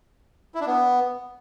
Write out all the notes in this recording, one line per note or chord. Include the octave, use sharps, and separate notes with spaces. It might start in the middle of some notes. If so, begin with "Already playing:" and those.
E4
D4
B3